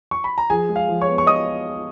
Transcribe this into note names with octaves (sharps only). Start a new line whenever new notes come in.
C#6
B5
A#5
F3 G#4 G#5
G#3
F5
F3
C#5 C#6
B3
C#6
D#5 D#6